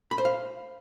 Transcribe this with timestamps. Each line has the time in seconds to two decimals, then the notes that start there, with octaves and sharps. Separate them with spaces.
0.11 B5
0.18 C5
0.25 F5